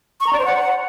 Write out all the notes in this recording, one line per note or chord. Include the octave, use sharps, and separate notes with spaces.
C#6
A#5
D5
C5
F#5